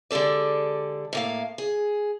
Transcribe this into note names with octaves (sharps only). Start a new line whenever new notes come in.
D3 G#3 G4 A4 D5
A2 A#3 F5
G#4